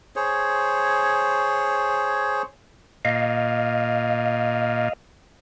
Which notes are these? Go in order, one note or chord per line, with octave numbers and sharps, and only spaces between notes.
G#4 C5 C#5
A#2 D#5 F5